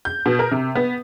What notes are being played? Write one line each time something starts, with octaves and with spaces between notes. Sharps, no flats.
G6
B2
A#4
C3
B3